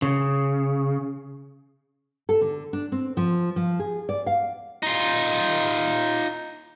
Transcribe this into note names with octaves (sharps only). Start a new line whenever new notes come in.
C#3
A4
D3
D4
C4
F3
F3
G#4
D5
F5
D#4 F4